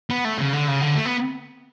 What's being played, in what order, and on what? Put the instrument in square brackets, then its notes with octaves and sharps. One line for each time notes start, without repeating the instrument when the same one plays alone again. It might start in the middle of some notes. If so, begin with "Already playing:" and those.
[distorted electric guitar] B3
A3
C#3
D3
C#3
D3
A3
B3